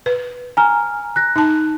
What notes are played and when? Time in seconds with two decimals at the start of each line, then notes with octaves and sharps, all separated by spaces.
0.06 B4
0.57 G#5 A#5 F6
1.16 F#6 A#6
1.36 D#4 A5